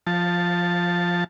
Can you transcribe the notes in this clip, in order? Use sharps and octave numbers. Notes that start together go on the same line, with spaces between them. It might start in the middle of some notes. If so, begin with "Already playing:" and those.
F3 A5